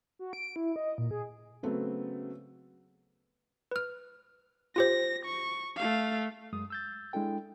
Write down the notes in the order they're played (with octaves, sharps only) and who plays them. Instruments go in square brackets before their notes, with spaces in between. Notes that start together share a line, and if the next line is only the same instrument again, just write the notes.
[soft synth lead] F#4
D7
E4
D#5
A#2
G#4
[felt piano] C#3 F#3 A3 B3 C4
[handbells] B4 F6
[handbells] F4 G4 C5 [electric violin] A#6
[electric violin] C#6
A3 F5
[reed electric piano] F#2 G#3 D#6
E6 G6 A6
G#3 D4 E4 A4 G5